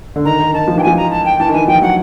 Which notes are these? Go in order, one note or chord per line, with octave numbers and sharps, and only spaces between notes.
D3
D#3 A#5
D#3
D#3 A5
F3
E3 G5
F3 G#5
A#5
A5
G5
E3 A5
D#3
E3 G#5
F3 G5
F#3 F#5